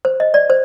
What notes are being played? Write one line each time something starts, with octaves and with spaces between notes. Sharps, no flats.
C5
D#5
D5
C5